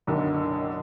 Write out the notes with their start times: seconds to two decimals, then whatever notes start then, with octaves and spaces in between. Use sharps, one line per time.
0.07 F#1 B1 F#2 D3 D#3